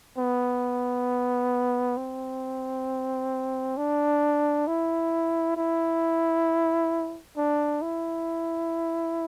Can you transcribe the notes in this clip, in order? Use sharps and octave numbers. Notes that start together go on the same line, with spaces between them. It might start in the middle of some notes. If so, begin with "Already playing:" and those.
B3
C4
D4
E4
E4
D4
E4